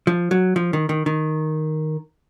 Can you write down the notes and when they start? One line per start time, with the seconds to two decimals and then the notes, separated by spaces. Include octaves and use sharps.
0.07 F3
0.31 F#3
0.56 F3
0.73 D#3
0.89 D#3
1.06 D#3